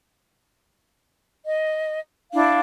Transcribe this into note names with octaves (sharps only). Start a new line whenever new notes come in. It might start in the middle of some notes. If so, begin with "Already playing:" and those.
D#5
D4 E4 F5